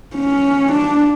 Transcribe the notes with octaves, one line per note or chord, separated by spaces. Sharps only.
C#4
D4